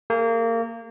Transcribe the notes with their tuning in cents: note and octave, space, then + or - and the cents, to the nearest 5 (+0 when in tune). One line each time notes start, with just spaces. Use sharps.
A#3 -25 G#4 +0